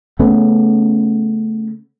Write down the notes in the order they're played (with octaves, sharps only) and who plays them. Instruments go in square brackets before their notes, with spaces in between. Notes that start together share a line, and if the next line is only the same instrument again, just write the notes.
[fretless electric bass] C#3 A3 B3 C#4